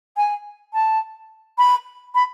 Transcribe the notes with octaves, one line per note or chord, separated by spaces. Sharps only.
G#5
A5
B5
B5